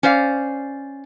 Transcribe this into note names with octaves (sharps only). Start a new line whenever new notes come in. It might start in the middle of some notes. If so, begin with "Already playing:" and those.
C#4 C5 D5 F5